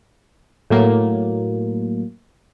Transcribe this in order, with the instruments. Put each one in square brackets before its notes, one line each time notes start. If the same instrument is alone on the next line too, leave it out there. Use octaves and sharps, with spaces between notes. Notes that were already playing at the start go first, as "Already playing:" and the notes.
[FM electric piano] A2 F#3 A#3